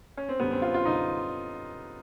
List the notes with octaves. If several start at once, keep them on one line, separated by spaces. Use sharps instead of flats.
C#4
C4
F#2 D3 G3 B3
C4
F4
F4
F#2 D3 G3 D#4